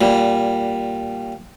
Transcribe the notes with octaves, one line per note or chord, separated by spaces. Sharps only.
A#2 G3